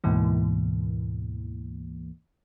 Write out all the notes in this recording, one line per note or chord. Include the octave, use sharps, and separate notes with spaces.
D2 G#2 B2 E3 A#3